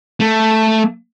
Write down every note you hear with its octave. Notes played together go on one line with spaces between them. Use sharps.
A3